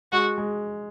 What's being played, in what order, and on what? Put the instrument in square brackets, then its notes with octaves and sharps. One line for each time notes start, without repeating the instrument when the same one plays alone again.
[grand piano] G#3 [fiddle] F#4
[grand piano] G#3